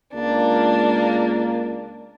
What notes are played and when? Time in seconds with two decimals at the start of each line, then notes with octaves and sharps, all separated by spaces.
0.14 C#2 A#3 D4